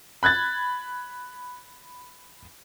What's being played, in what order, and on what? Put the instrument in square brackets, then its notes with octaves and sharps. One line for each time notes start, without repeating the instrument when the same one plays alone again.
[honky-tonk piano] B5 F#6 G#6 A6